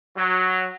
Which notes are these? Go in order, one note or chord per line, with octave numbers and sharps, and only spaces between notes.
F#3